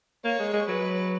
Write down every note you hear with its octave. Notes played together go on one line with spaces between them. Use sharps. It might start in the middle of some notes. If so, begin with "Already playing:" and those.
A#3 C#5
G#3
G#3
F#3 B4